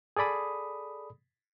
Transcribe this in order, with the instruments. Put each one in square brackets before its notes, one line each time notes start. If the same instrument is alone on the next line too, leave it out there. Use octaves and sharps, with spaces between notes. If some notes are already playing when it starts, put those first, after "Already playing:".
[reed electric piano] G#4 A4 D5 B5 D#6